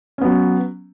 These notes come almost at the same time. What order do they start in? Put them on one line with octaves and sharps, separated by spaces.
C#4 B3 F#3